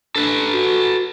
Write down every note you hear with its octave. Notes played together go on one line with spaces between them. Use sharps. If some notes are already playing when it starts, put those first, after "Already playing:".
D4 A4 B4
F#4